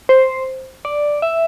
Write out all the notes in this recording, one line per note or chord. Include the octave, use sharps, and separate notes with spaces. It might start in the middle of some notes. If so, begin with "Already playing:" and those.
C5
D5
E5